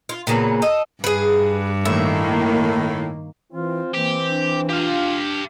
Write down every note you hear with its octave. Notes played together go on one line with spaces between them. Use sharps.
F4
A#2 C#3 F#3 B3
A4 D#5
G2 G#4 B4
A2 D#3 A#3 E5
E3 C4 F4
E3 A#3 G4
D4
F4 G4 F5